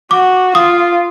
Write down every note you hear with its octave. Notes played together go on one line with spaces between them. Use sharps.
F#4 D6
F4 D#6